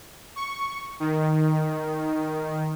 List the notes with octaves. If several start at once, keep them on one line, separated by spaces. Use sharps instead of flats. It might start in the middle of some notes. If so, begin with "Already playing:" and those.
C#6
D#3